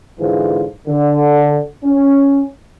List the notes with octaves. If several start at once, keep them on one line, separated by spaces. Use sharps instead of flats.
G#2 D3 E3 F3
D3
C#4